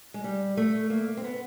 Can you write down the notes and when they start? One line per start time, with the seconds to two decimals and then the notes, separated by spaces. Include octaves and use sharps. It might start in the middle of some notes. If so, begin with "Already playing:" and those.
0.14 G#3
0.24 G3
0.57 A3
0.90 A#3
1.17 C4
1.24 B3